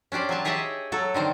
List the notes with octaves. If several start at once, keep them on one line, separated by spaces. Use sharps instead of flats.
C#4 D4 G4 C5 D5
F#3 C4 G#5 A5
G4 G#4 C#5 D#5 E5 A5
F#3 A4
D3 D#3 C4 C5